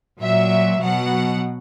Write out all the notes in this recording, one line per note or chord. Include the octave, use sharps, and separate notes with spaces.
A#2 F#3 E5
B2 F#3 F#5